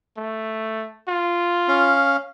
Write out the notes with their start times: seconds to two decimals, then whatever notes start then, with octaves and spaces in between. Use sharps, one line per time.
0.17 A3
1.08 F4
1.68 C#4 F5